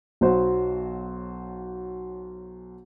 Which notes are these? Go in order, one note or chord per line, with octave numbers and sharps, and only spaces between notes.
B1 F#3 F#4 C5